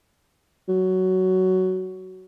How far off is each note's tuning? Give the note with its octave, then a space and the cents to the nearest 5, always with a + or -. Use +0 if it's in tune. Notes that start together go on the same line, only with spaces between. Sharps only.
F#3 +10